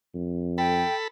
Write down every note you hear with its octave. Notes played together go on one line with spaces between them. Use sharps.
F2
A4 G5 B5